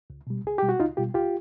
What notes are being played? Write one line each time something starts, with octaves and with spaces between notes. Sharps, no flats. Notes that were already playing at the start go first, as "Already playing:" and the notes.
C#2
B2 G3
C#2 G#4
B2 G3 G4
F#4
C#2 D#4 F4
B2 G3 F4 G4
C#2 F4 G4